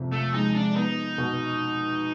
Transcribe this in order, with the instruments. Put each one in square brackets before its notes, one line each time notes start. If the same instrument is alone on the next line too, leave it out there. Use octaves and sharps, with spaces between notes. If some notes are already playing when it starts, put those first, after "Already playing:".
Already playing: [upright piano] F2 C3
[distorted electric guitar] A3
[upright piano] G#3 [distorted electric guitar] D#4
[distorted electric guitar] D4
[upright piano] B3 [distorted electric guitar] D#4
[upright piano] B2